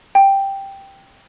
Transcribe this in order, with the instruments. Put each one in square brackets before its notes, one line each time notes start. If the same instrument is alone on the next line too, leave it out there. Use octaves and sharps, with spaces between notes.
[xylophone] G5